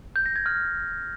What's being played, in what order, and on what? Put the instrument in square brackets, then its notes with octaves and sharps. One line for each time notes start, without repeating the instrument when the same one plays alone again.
[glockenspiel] G6
A#6
G#6
F6